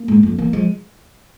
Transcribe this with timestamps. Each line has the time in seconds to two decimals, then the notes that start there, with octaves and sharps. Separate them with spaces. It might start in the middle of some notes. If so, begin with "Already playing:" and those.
Already playing: A#3
0.08 G#2
0.23 F2
0.38 E3 A#3
0.53 F3 G#3